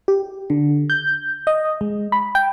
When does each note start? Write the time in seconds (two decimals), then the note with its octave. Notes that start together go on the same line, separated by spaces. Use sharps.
0.08 G4
0.50 D3
0.90 G6
1.47 D#5
1.81 G#3
2.12 B5
2.35 G5